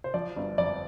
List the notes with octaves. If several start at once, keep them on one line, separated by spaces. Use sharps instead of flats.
C5
F3 D5
G1
F2 D5